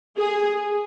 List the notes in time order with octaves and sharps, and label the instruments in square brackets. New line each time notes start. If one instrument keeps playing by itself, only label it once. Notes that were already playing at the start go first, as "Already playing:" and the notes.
[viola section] G#4